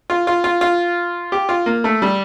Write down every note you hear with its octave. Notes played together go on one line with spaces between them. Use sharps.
F4
F4
F4
F4
G4
F4
A#3
A3
G3